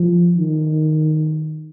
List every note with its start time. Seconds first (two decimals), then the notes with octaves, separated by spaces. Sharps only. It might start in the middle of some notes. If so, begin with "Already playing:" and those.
Already playing: F3
0.37 D#3